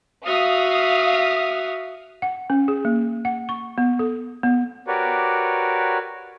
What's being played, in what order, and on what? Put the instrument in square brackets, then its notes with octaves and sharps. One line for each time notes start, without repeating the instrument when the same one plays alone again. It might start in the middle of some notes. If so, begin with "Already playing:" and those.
[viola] F#4 E5 [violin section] F5 D#6 F6
[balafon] F#5
C#4
G#4
A#3
F#5
C#6
B3
A4
B3
[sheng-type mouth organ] F#4 G4 A#4 B4 C#5 D5